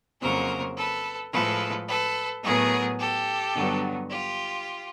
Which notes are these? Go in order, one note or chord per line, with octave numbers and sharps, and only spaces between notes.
F2 C#3 F#3 A#3 A#4 C5
A4 B4
A2 F3 G#3 A4 B4
A4 B4
A2 F#3 B3 G#4 A#4
G4 A4
G2 D3 F#3 B3
F4 G4